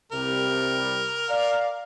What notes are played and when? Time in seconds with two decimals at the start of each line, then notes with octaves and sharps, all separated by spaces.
0.12 C2 C3 G3 A#4
1.29 D5 F5